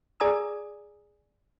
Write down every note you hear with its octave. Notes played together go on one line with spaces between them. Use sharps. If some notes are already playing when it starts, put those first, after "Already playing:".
G#4 D5 G#5 A#5 D#6 E6